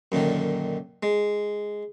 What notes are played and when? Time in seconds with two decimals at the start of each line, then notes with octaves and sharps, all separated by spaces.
0.12 F#2 A#2 D3 D#3
1.03 G#3